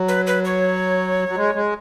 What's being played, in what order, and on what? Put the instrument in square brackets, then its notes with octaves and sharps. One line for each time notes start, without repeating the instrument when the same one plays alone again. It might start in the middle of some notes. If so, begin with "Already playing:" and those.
Already playing: [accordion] F#3
[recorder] B4
B4
C#5
[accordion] F#3
G#3
G#3